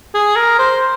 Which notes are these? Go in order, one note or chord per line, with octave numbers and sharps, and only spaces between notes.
G#4
A#4
C5